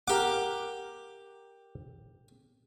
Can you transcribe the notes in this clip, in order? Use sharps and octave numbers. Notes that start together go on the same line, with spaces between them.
G4 A#4 F5 F#5 D6